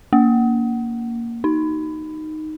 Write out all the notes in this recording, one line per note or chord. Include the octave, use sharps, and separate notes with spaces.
A#3
D#4